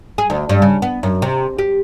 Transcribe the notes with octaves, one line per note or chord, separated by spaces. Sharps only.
G#4
D2
G2
C#3
B3
F#2
C3
G4